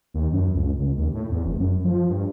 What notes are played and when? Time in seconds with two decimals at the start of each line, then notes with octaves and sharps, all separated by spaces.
0.14 D#2
0.32 F#2
0.55 C#2
0.79 C#2
0.97 D#2
1.14 A2
1.31 E2
1.45 F1
1.60 F#2
1.84 F3
2.10 G2